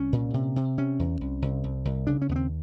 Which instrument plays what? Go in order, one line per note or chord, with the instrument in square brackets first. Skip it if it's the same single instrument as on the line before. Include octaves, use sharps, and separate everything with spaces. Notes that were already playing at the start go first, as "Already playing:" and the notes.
Already playing: [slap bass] C2 C#4
A#2
C3
C3
C3 C#4
E2
C2
C2
C2
C2
C#3 D4
C#4
D#2 B3
C4